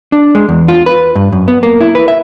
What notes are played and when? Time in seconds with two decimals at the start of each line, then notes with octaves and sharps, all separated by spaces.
0.12 D4
0.35 G#3
0.49 E2
0.68 F4
0.86 B4
1.15 G2
1.32 F#2
1.48 B3
1.63 A#3
1.81 E4
1.95 B4
2.08 E5